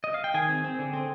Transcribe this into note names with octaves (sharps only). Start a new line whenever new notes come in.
D#5
F5
G5
D#3 G#4 G#5
C4
C4
D3
C4